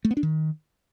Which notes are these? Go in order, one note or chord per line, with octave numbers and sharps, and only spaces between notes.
A3
B3
D4
D#3